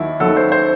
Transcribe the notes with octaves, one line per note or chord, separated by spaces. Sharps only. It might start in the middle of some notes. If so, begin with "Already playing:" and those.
Already playing: D#2 D#3 F#3 E4
D#2 D#3 F#3 A4
C5
C5